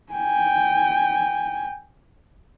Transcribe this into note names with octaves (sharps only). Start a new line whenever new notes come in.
G5 G#5